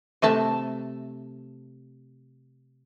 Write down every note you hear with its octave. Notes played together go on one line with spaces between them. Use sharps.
C3 A3 E5 A5